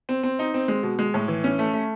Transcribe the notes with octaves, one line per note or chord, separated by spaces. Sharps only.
C4
C4
D#4
C4
G#3
B2
G#3
A2
E3
C#4
A3
A3